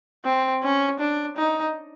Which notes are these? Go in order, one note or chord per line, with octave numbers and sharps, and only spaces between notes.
C4
C#4
D4
D#4